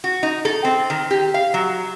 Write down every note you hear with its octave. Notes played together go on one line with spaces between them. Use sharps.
F#4
D#4
A4
C4
D#3
G4
F5
F#3